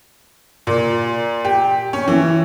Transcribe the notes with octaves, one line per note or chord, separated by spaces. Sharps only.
A#2
G4
C#4
E3